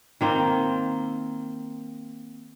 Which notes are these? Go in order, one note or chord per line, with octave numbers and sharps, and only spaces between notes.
D#3 A#3 C4